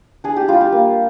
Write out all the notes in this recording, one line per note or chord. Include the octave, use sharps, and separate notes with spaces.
D4 G#4
G4
G3 F4
G4
A#3